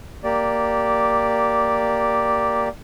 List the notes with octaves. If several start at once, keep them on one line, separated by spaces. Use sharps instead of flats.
A#3 G4 D5